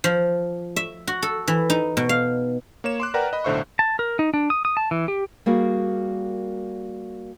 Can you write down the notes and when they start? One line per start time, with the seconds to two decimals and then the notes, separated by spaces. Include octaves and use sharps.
0.04 F3
0.76 E5
1.07 F#4
1.22 A4
1.48 E3
1.70 D#4
1.97 B2
2.09 F5
2.84 A#3 C#5 E7
3.00 C6 D6 F#6
3.14 A#4 B4 D5 F#5 G5 A#5
3.33 D#5 B5
3.44 B1 A2 D3 C5 E5 C#6
3.79 A5
3.99 A#4
4.19 D#4
4.34 D4
4.50 D#6
4.65 D#6
4.77 A5
4.91 E3
5.08 G4
5.46 G3 A#3 F#4 G#4 A#4